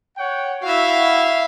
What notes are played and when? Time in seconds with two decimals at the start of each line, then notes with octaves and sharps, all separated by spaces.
0.18 C#5 F#5 G5
0.63 E4 F#4 E5 F5